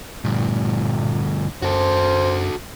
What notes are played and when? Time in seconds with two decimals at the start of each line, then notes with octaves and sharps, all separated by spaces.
0.25 D2 G2 A#2
1.62 F#2 F#4 A4 C5